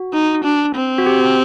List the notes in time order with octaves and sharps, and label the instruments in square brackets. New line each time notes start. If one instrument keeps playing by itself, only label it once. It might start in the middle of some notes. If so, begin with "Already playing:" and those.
Already playing: [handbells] F#4
[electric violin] D#4
D4
C4
[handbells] F#4
G4